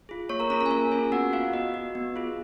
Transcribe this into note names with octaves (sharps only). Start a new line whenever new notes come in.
F4 G#4
A#3 C#5 C#6
A#4 A#5
C#4 F4 G#4 A#4 A#5
A#4 A#5
G#5
A#3 A#4 A#5
C#4 F4 G#4 G#5
B3 F#4 F#5
F4 F#4 F5
B3 D#5
F#4
B3
F4 G#4